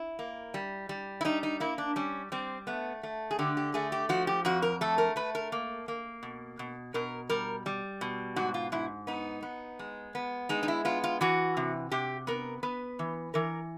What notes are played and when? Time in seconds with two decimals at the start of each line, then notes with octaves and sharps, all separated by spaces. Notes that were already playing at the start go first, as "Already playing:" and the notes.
Already playing: E4
0.19 A#3
0.54 G3
0.89 G3
1.21 E4
1.25 G3 D#4
1.43 D#4
1.60 A#3 E4
1.78 D4
1.96 G3 C#4
2.32 G3 C4
2.67 A3 B3
3.03 A3
3.31 G#4
3.39 D3 G4
3.57 G4
3.74 A3 G#4
3.92 G4
4.09 F3 F#4
4.27 G4
4.45 F2 F#4
4.62 A#4
4.81 A3 A4
4.98 A#4
5.16 A3 B4
5.35 A#4
5.52 A#3
5.88 A#3
6.23 B2
6.59 B2
6.94 B2 A#4
7.30 G3 A#4
7.66 G3
8.01 B2
8.36 G#2 F#4
8.54 F4
8.72 G#2 E4
9.07 B3 D#4
9.43 B3
9.79 G#3
10.15 B3
10.49 G#3 D#4
10.63 D#4
10.68 E4
10.85 B3 F4
11.04 F4
11.21 E3 F#4
11.57 C3
11.91 C3 G4
12.27 B3 A#4
12.63 B3 B4
12.99 E3
13.34 E3 A#4